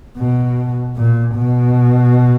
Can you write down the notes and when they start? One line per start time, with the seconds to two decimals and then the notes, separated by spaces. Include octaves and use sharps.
0.17 B2
0.96 A#2
1.35 B2